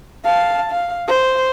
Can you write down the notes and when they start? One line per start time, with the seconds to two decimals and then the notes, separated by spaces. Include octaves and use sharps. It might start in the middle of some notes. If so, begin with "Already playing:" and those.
0.25 F5 A5
0.70 F5
1.07 C5